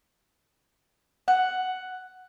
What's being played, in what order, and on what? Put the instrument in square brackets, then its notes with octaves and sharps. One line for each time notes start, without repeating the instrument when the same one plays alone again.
[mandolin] F#5